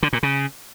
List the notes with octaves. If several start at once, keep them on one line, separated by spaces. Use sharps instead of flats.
D3
A#2
C#3